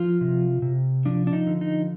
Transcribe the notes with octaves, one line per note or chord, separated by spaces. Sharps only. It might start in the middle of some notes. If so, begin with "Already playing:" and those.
Already playing: F3 F4
C3
C3
F3 D4
D4
D#4
D3
D#4